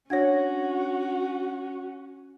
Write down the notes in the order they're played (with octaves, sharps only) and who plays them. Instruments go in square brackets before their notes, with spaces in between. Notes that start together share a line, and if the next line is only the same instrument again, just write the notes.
[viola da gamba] C#4 [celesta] D4 F#5 A#6 [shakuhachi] F#4 [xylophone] C#5 G#6